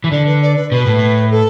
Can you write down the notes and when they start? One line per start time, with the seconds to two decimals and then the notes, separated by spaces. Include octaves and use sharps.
0.04 E3
0.11 D3 D5
0.26 B4
0.41 D5
0.56 B4
0.71 B2 B4
0.87 A2
1.31 A4